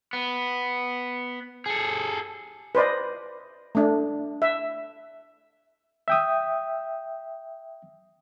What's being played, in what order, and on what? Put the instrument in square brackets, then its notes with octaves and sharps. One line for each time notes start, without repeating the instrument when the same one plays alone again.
[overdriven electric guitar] B3
G#4 A4
[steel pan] B4 C5 D5 D#5
A3 D4
E5
[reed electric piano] E5 G5 D#6